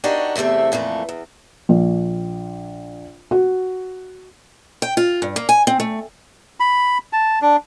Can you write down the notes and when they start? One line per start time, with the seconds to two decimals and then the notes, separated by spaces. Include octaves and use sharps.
0.04 D4 D#4 F#4 G4 A#4 C#5
0.36 E2 C3 A3 C4 E5
0.72 F2 A#2 E3 A3
1.09 E2
1.69 A#1
3.31 F#4
4.82 G5
4.97 F4
5.22 G2
5.36 A#3
5.49 G#5
5.67 C4
5.80 A3
6.60 B5
7.13 A5
7.42 D4